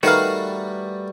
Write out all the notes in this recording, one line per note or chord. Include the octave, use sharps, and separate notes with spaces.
D#3 G3 A3 F#4 A#4 B4 F5